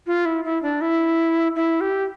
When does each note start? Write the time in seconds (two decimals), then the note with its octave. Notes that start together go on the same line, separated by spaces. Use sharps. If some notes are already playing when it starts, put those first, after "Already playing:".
0.07 F4
0.25 E4
0.44 E4
0.62 D4
0.81 E4
1.56 E4
1.81 G4